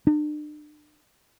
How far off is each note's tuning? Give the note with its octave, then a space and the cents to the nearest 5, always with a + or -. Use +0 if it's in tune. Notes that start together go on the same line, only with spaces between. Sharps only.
D4 +40